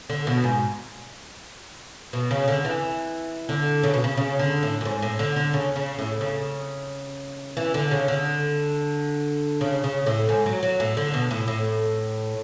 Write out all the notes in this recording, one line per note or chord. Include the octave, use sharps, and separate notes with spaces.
D3
B2
G#2
B2
C#3
D3
E3
D3
C#3
B2
C#3
C#3
D3
A2
F#2
G#2
A2
D3
D3
C#3
C#3
A2
C#3
E3
D3
C#3
D3
C#3
C#3
A2
G#2
F#3
F#3
A2
D3
B2
A2
A2